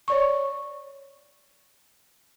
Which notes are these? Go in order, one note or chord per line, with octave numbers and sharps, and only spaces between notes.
C#5 D5 C#6